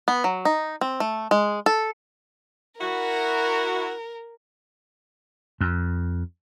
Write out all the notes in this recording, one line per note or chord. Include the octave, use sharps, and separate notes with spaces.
B3
F#3
D#4
C4
A3
G#3
A4
E4 F#4 A#4
F2